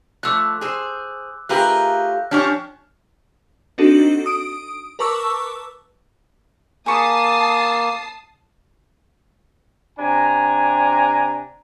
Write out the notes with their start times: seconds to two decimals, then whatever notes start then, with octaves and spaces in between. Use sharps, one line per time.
0.23 F3 A3 D6 E6 F#6
0.61 G#4 C5
1.49 A3 F4 G4 G#4 A#4 B4 F#6 A#6
2.31 F3 C#4 D4 G4 C#5 F6
3.78 C4 D4 D#4 F#4 A4
4.26 D#6 D7
4.99 A#4 B4 A5 C#6 D6 E6
6.86 A#3 G#4 A5 B5 C#6 D#6 C7
9.98 C3 D4 G#5 A#5